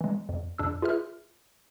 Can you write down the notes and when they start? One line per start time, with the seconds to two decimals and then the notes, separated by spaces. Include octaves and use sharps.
0.01 E3 G#3
0.29 F2
0.58 F2 D4 E6
0.82 F4 G#4 B4 E5 F6